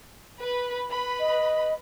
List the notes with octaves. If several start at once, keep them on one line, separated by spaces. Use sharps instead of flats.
B4 B5
B4 B5
D#5